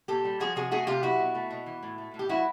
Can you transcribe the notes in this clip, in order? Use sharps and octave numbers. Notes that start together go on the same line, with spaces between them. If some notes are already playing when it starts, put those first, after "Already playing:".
A#2 G4 A4
G3
F3 F#4 G#4
C3 F#4 G#4
A3 F#4 G#4
C3 F4 G4
F#3 E4 F#4
B2
A3
B2
E3
A2
A3
A2
G4
F#3 E4 F#4